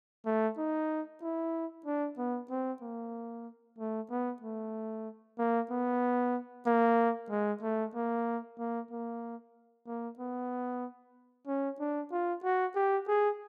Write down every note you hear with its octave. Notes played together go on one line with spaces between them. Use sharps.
A3
D#4
E4
D4
B3
C4
A#3
A3
B3
A3
A#3
B3
A#3
G#3
A3
A#3
A#3
A#3
A#3
B3
C#4
D4
F4
F#4
G4
G#4